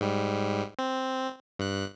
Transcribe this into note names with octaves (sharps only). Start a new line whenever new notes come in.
G#2 G3
C4
G2 F#6